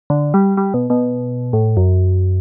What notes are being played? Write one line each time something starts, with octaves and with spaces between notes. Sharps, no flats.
D3
G3
G3
B2
B2
A2
F#2